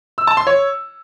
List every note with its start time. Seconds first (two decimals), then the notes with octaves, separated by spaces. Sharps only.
0.18 E6
0.27 A5
0.37 C6
0.47 C#5